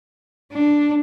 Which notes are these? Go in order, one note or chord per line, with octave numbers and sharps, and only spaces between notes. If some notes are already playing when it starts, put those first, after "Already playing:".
D4